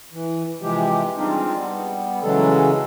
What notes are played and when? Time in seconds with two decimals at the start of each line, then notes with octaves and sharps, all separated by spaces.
0.12 E3
0.61 C3 E3 F3 G#3 G4
1.17 G3 G#3 C4 D4 D#4 F4
1.56 G3 B3
2.23 C#3 E3 F#3 G#3 A4